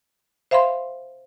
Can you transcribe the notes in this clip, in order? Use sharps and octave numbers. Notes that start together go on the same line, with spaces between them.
C5 E5 F5 B5 C6